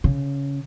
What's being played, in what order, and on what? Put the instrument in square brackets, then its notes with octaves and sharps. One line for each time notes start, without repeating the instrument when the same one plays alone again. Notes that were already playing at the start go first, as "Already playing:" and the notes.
[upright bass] C#3